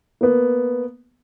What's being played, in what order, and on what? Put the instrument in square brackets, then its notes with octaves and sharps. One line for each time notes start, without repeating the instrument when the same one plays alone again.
[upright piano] A#3 B3